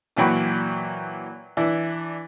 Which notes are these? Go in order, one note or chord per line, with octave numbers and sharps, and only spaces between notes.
A#2 E3 F#3 G5 B5 C#6
E3 D4 E4